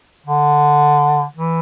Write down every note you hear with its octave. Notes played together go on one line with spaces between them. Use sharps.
D3
E3